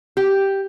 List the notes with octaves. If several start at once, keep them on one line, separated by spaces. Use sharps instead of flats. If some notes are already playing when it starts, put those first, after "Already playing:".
G4